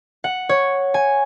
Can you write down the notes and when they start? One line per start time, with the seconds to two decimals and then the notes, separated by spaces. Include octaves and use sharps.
0.24 F#5
0.49 C#5
0.94 G#5